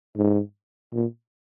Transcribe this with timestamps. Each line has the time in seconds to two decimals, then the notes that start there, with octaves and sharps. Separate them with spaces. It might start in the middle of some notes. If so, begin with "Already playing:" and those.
0.16 G#2
0.93 A#2